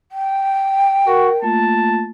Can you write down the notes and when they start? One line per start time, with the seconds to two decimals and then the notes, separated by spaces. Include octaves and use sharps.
0.12 G5
1.07 F#4 A#4
1.42 A3 A#3 F4 A5